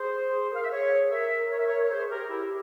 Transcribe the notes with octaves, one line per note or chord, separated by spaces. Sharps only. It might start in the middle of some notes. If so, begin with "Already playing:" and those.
Already playing: G#4 C5
G#4
A#4 F5
E5
G#4 C#5
A#4 E5
C#5
E5
C#5
C#5
G#4 C5
G4 A#4
G#4
E4 G4